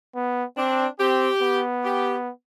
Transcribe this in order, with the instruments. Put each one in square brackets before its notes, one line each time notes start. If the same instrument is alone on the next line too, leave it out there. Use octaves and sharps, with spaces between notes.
[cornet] B3
[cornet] C4 [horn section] D4
[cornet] C4 [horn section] G4
[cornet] B3
[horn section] G4